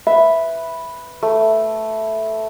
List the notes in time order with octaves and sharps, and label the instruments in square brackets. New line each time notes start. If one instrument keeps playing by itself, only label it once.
[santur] B4 [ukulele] E5
[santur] A3